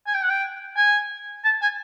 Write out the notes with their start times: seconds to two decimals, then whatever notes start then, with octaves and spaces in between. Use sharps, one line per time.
0.06 G#5
0.14 G5
0.22 F#5
0.30 G5
0.76 G#5
1.44 A5
1.62 G#5